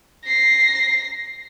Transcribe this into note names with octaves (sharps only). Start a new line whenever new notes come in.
A#6 C7